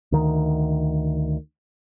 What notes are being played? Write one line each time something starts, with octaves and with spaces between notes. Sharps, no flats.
D2 D#3